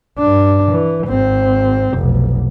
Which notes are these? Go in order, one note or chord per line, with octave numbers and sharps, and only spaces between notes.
G2 D4
E3
G#1 C4
F1 B1